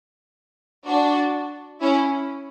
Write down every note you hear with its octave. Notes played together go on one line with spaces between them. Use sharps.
D4 F#4
C#4 E4